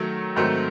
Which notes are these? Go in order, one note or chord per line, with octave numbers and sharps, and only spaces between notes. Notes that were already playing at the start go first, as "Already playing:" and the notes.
Already playing: D#3 F#3 A3
G#2 D#3 F#3 A3 C4